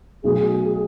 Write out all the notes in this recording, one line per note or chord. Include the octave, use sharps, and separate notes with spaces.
B1 B2 A3 G#4